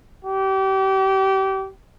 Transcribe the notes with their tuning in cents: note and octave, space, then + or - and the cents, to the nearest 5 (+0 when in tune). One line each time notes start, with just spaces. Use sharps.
G4 -30